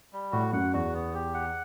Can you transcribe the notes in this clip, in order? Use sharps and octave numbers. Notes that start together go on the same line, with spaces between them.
G3
A2 F#4
F#2 F#5
E2 F#4
B3
G4
F#5